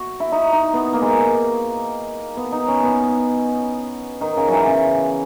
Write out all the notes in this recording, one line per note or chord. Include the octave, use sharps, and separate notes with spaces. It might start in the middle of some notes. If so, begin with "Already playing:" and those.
Already playing: F#4
E4
D#4
D#4
B3
A#3
G#3
A#3
B3
D#4
C#4
B3
D#3
C#3
E3 F#3
C#3